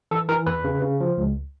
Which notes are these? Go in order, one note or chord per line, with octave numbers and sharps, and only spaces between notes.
E3 A4
E3 A#4
E2 B4
C#3
C#3
F3
C#2